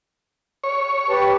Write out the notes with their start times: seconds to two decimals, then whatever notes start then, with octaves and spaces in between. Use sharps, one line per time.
0.64 C#5
1.09 G4 B4 A5